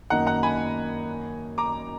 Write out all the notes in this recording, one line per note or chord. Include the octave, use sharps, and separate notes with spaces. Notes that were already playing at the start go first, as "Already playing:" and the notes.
F#2 D#3 A#3 D#4 F#5 A#5
F#5 A#5
G#5 B5
A#5 D6